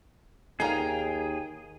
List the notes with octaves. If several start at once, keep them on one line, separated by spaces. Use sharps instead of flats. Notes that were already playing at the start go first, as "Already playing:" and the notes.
D#2 D#4 G#4 A#4 F5 G5 G#5 A#5